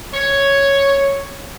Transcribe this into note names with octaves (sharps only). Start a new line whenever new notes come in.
C#5